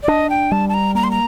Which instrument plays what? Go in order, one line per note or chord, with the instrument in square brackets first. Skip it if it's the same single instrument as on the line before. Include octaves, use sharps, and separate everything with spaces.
[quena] D5
[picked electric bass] D4 [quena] D#5
[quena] G5
[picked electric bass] G3 [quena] A5
[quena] A5
A#5
[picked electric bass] A#3 [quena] A#5
[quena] C6
A#5